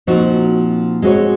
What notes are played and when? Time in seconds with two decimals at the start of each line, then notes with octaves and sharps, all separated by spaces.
0.07 A#2 F3 C4 D#4 F#4
1.02 G#3 C4 F#4 C#5